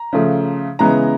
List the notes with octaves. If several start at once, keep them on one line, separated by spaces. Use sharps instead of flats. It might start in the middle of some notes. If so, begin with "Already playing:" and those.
Already playing: A#5
C#3 F3 A3
C#3 E3 G#3 B3 A#5